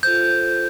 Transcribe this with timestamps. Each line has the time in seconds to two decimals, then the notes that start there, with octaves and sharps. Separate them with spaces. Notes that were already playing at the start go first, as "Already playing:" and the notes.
0.03 F4 A4 C5 G6